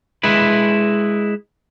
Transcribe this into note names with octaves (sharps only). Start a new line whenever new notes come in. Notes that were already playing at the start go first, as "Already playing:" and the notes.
G#3 E4 B4